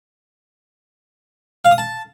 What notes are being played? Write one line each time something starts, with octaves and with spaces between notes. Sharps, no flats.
F5
D#6
A5